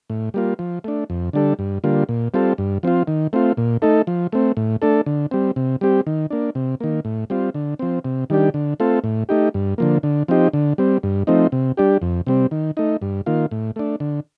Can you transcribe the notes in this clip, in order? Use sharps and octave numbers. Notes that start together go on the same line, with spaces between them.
A2
G3 A#3 F4
F3
A3 D4
F2
D3 G3 D4 A4
G2
D3 G3 A#3 F4
A#2
G3 C4 F4 A4
G2
F3 C4 F4
D#3
A3 C4 F4
A#2
A3 D#4 A4
F3
A3 C4
A2
A3 D4 A4
D3
G3 C4
C3
G3 C4 G4
D#3
A#3 D4
C3
D#3 A#3
A2
G3 C4 F4
D3
F3 C4
C3
D#3 G3 D4 G4
D3
A3 C4 F4 A4
A2
A3 D#4 G4
G2
D3 F3 A#3
D3
F3 C4 D#4 G4
D3
G3 C4
G2
F3 A3 C4 D#4
C3
G3 D4 G4
F2
C3 G3 C4
D#3
A3 D#4
G2
D#3 A#3 F4
A2
A3 D4
D3